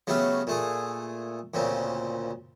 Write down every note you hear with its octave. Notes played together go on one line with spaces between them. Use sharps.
C#3 F#3 A3 B3 G4 F5
A#2 A3 G#4
D2 A#2 C#3 C4